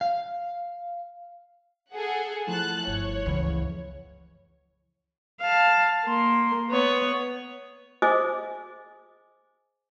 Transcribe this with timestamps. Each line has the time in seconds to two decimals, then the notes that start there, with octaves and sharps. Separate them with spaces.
0.01 F5
1.95 G#4 A4 F#5
2.47 F3 A3 E4 A5 F#6
2.87 G1 C#5
3.26 C#2 F#2 C#3 E3 B3
5.42 F5 A5
6.06 A#3 C6
6.70 B3 C#5
8.02 G#4 C5 D#5 G#5 D6 D#6